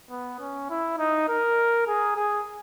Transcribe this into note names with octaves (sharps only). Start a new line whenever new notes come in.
B3
C#4
E4
D#4
A#4
G#4
G#4